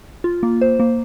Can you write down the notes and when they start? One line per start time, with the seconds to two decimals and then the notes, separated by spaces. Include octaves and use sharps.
0.24 F4
0.43 A#3
0.61 C5
0.80 A#3